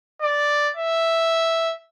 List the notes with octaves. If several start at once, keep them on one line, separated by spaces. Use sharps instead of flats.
D5
E5